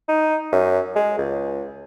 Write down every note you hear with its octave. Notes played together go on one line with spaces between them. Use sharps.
D#4
F#2
G#3
C#2